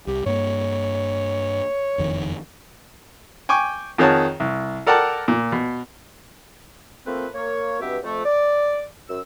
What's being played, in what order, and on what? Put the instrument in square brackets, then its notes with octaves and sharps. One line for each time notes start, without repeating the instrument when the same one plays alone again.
[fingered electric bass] C2 [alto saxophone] G4
[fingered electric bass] G2 A#3 [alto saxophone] C#5
[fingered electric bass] F#1 F2 D#3
[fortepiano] G5 G#5 C#6 D6
F2 D#3 G#4 C#5 F#5 A5
C2
A4 A#4 D5 F#5 G5 A5
A#2
B2
[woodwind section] F3 A3 A#3 C4 B4 C5
A#3 C#5
G2 B2 B3 C4 G4 E5
F2 A3
D5
F#2 E6